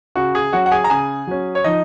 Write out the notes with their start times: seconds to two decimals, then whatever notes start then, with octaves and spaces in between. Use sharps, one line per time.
0.15 C#3 F#4
0.35 G#4
0.53 F#3 C#4 F#4 F#5
0.66 F#5
0.72 G#4 G#5
0.84 A#5
0.90 C#3 G#4 G#5
1.27 F#3 C#4
1.55 C#5
1.64 F3 D#4 D#5